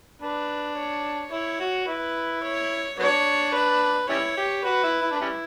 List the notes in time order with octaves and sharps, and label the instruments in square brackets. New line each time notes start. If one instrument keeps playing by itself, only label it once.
[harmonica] D4 [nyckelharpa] B4
[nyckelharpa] C#5
[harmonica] E4 [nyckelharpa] C#5
[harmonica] F#4
[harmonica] E4 [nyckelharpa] B4
[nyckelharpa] C#5
[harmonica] F#3 B3 D4 [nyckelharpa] C#5
[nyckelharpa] B4
[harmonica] G3 C#4 E4 [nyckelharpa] C#5
[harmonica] G4
[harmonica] F#4 [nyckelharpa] B4
[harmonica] E4
E4
D4
G3 C#4 E4